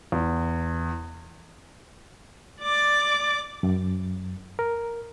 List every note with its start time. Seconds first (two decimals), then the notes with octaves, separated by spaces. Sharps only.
0.12 E2
2.61 D5 D6
3.63 F#2
4.59 A#4